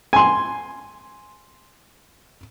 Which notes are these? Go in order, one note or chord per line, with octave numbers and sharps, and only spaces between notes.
G#5 C6